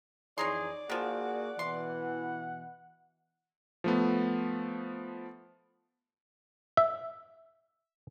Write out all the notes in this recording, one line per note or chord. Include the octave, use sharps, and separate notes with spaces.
F2 E3 D#4 G#4 C#5 D5 A#5 C6
D#3 F3 A#3 F#4 G#4 F#5
B2 E3 C6
F3 A3 B3
E5